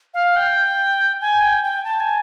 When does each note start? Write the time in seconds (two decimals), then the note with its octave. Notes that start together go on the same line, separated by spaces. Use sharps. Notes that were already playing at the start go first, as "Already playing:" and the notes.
0.14 F5
0.36 G5
1.21 G#5
1.41 G5
1.64 G5
1.84 A5
2.00 G#5